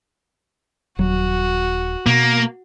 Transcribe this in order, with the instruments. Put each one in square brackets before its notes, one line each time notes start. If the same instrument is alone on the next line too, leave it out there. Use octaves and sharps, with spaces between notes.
[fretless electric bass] D#1 F#3 [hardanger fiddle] F#4
[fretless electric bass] B2 [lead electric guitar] A#3